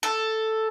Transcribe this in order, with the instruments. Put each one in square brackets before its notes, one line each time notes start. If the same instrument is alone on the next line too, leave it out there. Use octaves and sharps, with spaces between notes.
[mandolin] A4